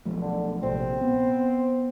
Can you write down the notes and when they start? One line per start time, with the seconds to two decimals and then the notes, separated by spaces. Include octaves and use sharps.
0.05 B1 F3 A3
0.22 D3
0.63 A#1 C3 C4
1.01 B3